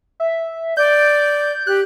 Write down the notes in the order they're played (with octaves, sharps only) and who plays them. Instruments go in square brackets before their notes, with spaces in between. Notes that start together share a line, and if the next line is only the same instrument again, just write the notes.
[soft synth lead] E5
[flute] D5 [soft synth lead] G6
[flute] G4 [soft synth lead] F#6